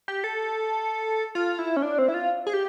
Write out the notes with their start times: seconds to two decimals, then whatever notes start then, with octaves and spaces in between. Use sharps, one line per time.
0.08 G4
0.24 A4
1.35 F4
1.59 E4
1.77 C#4
1.82 D4
1.98 C4
2.08 E4
2.14 F4
2.47 G#4
2.53 G4